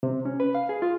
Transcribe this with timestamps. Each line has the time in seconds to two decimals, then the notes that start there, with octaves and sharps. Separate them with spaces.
0.03 C3
0.25 C#4
0.40 B4
0.55 F5
0.69 G#4
0.82 F4